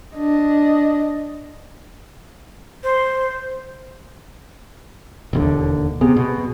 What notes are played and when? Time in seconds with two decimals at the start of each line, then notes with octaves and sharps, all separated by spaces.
0.17 D4 D#5
2.84 C5
5.33 E1 D#2 D3
6.01 C3 B3 G#4
6.16 B2